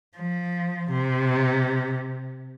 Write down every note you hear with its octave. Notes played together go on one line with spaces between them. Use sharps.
F3
C3